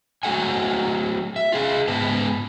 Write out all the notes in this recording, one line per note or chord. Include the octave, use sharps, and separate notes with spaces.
F#3 A3 A4 F#5 G#5
E5
F4 G#4 F5
G#2 B3 B4 A5